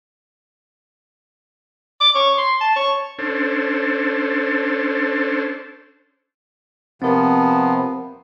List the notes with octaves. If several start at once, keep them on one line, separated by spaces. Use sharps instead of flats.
D6
C#5
C6
A5
C#5
C#4 D4 A4 C5
C3 F3 B3 C4 A#4